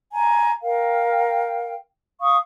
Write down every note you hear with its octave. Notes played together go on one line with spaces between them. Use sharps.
G#5 A#5
A#4 F5 G5
F5 C#6 D#6